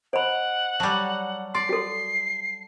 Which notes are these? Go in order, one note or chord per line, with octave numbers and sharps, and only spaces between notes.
C5 D#5 F#5 B5 D7
F#3 G3 A5
D5 C6 C7
F#4 A4